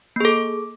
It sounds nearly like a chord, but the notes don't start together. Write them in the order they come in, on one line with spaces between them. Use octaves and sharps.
A#3 G#4 A4